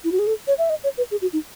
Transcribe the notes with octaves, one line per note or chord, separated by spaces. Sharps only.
E4
F#4
G#4
A4
C#5
E5
D#5
C#5
B4
G#4
F#4
D#4